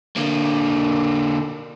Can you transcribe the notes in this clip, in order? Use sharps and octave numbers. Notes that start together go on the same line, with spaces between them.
D3 A#3